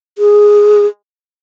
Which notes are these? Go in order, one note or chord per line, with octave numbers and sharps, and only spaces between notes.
G#4